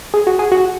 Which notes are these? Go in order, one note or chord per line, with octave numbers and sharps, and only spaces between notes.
G#4
F#4
G#4
F#4